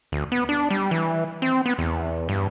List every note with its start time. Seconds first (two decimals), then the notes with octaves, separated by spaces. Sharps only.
0.12 D2
0.32 B3
0.49 D4
0.71 G3
0.91 E3
1.42 C4
1.66 B3
1.78 E2
2.29 G2